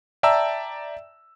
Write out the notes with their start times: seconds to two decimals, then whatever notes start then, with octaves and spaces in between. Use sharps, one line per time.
0.23 D5 E5 G5 A5 A#5 E6